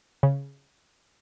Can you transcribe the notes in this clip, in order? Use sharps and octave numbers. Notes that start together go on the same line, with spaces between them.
C#3